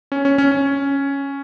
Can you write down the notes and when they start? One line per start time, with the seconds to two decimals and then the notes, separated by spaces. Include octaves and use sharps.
0.12 C#4
0.25 C#4
0.38 C#4
0.51 C#4